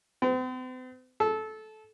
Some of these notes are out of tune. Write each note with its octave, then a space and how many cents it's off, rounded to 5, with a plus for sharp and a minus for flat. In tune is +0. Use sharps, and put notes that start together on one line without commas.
C4 -45
A4 -20